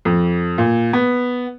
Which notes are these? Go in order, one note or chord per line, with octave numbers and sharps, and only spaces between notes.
F2
A#2
B3